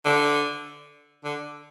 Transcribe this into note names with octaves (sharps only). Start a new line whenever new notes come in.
D3
D3